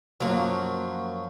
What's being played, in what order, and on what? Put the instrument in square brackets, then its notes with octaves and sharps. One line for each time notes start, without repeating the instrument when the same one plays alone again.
[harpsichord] F#2 F3 [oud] F#3 A#3